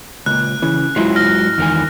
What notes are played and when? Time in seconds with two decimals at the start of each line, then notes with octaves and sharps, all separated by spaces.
0.26 C#2 A#2 F#6
0.62 C#3 E3
0.96 G#2 F#3 G#3 E4 F4 C6
1.16 F6 A#6
1.58 E2 D#3 G#5